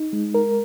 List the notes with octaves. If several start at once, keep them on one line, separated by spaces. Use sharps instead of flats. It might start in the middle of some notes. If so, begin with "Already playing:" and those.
Already playing: D#4
G#3
A#4